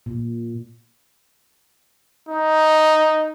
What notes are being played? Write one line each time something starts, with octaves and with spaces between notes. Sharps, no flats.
A#2
D#4